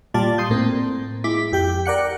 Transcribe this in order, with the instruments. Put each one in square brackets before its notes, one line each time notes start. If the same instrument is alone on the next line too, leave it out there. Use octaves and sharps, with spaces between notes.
[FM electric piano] A#2 G3 F4 D5 A5 A6
C6 D#6 G6
A2 A#3 C4
G#3 E4 D6 B6
F2 G4 G5
A#4 D5 F#5 C#7